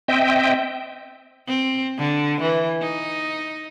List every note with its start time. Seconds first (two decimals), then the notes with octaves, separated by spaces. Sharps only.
0.08 C4 D#5 E5 G5
1.47 C4
1.98 D3
2.40 E3
2.81 D#4